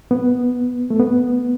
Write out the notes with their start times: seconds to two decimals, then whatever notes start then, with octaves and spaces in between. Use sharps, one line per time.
0.11 B3
0.90 A3
1.00 B3